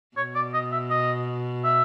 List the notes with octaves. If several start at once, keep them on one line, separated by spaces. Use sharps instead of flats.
B2 C#5
D5
D#5
E5
D#5
E5